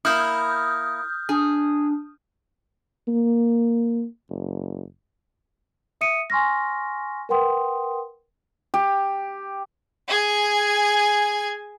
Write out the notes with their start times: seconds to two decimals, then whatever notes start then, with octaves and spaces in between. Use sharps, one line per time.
0.05 A#3 E4 D#6 F6 G6
1.29 D4 G#4
3.08 A#3
4.30 F#1
6.01 E5 D#6 C#7 D#7
6.30 G#5 C6 C#6 F6 A#6
7.29 A#4 B4 F#5 G5 C6 D#6
8.74 G4
10.09 G#4 G#5